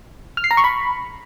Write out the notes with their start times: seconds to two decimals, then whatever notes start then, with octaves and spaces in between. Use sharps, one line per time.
0.37 F6
0.44 C7
0.51 A#5
0.57 C#6
0.64 B5